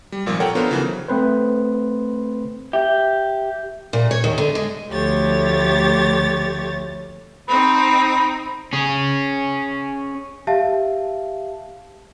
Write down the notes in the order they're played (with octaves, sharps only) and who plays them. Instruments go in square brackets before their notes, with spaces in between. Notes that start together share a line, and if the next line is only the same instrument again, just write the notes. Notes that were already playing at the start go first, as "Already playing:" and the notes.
[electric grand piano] G3
G#1 A#2 F3
A4 A#4 C#5 F#5 G5 C#6
B3 D4 F4 A4 A#4 C5
C#3 E3 F#3
[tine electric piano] A3 C4 B4 C5
[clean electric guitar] G4 [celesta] E5
[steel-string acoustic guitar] A#2
C#5
D#2
D3
G#3
[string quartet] D2 F3 A3 G4 C#5 A6
[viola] C4 D#4 [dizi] B5
[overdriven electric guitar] C#4 G#4
[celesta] G4 E5 F5 A5